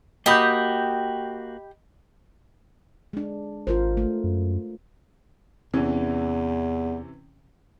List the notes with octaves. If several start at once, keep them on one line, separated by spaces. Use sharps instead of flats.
A#3 F#4 G4 D#5 B5 D#6 G6
G#3 D4
G#1 F4 A#4 C5
A3
F#2
E2 C3 E3 C#4